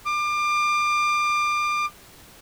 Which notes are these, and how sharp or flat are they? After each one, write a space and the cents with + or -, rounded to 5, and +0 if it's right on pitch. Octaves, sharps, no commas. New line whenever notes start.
D6 +30